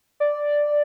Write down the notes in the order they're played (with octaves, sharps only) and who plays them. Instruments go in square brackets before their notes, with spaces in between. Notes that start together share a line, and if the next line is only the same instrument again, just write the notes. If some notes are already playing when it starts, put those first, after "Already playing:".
[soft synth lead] D5